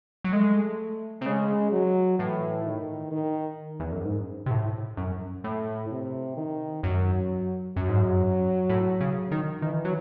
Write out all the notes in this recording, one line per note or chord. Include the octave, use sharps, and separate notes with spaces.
F#3
G#3 A3
C3
C#3 G#3
F#3
A2 E3
D#3
D#3
E2
F#2
G#2
C3
A2
F#2
A2
C3
D#3
F#2 F#3
F#2 F#3
G#2
F#2
A2
C#3
D#3
D#3 E3
F#3